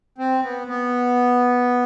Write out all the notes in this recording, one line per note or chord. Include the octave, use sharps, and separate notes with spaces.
C4
B3
B3